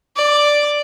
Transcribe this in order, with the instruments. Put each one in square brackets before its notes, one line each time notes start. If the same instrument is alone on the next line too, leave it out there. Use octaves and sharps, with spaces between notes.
[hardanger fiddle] D5